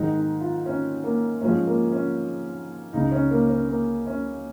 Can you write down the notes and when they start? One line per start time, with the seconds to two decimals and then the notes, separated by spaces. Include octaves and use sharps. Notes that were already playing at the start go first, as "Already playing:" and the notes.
Already playing: G#2 D#3 G#3 D#4
0.15 D#4
0.41 F4
0.66 C#4
1.04 A#3
1.41 G#2 F3 G#3 C#4
1.67 A#3
1.92 C#4
2.93 C#2 C#3 G#3 D#4
3.12 C#4
3.31 A#3
3.50 C#4
3.69 A#3
4.07 C#4